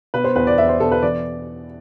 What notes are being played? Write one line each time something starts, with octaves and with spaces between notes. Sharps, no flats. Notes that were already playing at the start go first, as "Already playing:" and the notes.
B2 B4
C5
E2 B4
D5
E2 E5
C5
B2 A4
B4
E3 D5